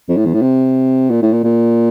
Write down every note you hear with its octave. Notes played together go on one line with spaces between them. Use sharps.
F2
A2
E2
A2
C3
A#2
A2
A#2
A#2